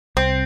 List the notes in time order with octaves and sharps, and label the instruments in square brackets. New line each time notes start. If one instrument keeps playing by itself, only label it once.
[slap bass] C2 [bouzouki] C4